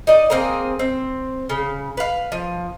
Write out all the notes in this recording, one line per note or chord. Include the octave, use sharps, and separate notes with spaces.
D#4 D5 D#5
A#3 C4 G#4 A#4
C4
C#3
B4 F5
F3